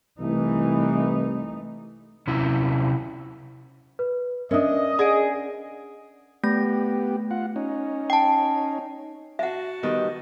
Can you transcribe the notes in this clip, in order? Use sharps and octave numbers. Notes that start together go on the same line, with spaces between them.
C2 E3 A3 D#4
C3 C#4 E4
B4
C#4 D4 A#4 D#5 E5 D#6
G#4 D5 F#5 D7
A3 B3 G4 A#6
F4 F#5
C#4 D#4
G5 A5
F#4 E5 F#5 A5
D#3 G3 B3 D#5